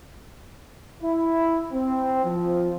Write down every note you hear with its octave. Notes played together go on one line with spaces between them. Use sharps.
E4
C4
F3